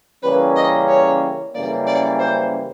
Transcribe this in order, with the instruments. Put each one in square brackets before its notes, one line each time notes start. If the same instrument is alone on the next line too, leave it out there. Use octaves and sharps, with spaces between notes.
[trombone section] C#3 E3 G3 A#3 C#4 [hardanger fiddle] B4
[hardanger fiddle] D#5
C#5
[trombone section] F#2 C#3 E3 G3 A#3 [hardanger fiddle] D5
[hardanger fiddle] D5
C5